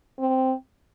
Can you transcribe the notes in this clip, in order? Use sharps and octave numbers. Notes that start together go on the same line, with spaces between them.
C4